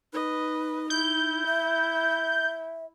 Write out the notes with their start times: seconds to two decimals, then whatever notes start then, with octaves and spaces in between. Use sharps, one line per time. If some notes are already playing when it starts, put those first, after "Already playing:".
0.13 D#4 B4 D#5
0.90 E4 G6
1.46 E5